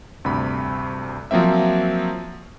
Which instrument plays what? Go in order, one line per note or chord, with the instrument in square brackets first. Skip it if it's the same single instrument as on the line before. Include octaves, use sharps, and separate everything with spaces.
[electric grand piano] D2 G2 C3 B5
F3 F#3 A#3 C4 E5